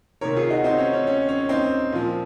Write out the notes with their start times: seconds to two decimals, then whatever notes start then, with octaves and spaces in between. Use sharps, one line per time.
0.21 C3 D#3 A#4 C#5
0.36 F4 G#4
0.50 D#4 F#4
0.64 C4 D#4
0.78 C#4
0.93 C#4
1.07 C#4
1.29 C#4
1.49 C4 D#4
1.92 A#2 F3